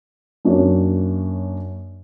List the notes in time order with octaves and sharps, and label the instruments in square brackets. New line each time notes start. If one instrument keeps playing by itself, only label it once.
[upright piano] F#2 A#3 D4 F#4 C#5